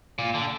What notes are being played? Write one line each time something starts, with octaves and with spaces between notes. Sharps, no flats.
A#2
D3